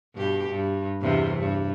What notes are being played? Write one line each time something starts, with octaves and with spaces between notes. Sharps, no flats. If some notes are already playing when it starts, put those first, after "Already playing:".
G2 B2 G4
G2
E2 G2 C3
G2